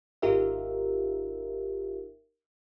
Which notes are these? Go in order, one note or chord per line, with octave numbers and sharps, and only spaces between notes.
G#1 D#4 F4 G4 A#4 E5